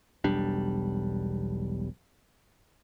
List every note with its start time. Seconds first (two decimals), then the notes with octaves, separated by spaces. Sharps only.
0.24 E1 B1 G3 D4